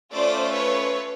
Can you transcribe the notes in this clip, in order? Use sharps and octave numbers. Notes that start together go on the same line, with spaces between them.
A3 C#4 F4 C5 D5
B4 C#5